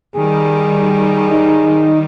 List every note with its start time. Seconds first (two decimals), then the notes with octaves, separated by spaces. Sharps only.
0.16 D#3 G3 G#4
1.30 D#4